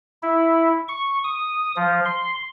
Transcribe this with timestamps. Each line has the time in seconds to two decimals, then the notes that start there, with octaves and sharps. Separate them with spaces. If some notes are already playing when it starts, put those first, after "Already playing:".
0.23 E4
0.88 C#6
1.24 D#6
1.76 F3
2.05 C6